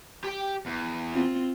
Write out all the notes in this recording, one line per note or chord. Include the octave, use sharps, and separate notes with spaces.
G4 G5
E2
C4 F4